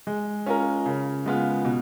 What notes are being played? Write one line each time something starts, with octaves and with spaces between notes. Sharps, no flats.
G#3
C#4 F4 A#4
C#3
G#3 B3 F4
B2